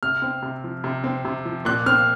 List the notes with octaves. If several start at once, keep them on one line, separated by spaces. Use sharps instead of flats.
C3 F6
C4
C3
F3
C3
C4
C3
F3
A#2 F#6
C4 F6